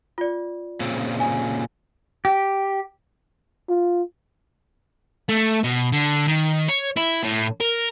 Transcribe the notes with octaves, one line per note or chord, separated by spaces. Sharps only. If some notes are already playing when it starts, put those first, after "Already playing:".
F4 D5
A#2 C#3 C4
G#5
G4
F4
A3
B2
D3
D#3
C#5
E4
A2
A#4